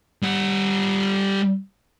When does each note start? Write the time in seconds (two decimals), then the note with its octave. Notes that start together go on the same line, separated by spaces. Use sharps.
0.23 G3 F#5